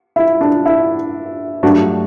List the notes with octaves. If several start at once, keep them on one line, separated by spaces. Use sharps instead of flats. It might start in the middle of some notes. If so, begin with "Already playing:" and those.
E4
D4
E4
G2 F#3 A3 D4 F#4